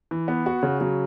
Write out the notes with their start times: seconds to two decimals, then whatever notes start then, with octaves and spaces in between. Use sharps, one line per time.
0.11 E3
0.28 B3
0.46 F#4
0.63 C#3
0.81 F#3